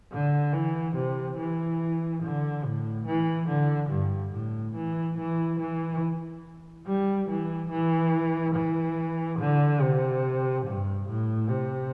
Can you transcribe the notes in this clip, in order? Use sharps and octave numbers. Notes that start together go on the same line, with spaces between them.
D3
E3
C3
E3
D3
A2
E3
D3
G2
A2
E3
E3
E3
G3
E3
E3
E3
D3
C3
G2
A2
C3